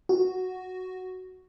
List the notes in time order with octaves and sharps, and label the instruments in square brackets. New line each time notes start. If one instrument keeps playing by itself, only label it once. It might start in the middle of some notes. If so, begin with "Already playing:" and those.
[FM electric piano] F#4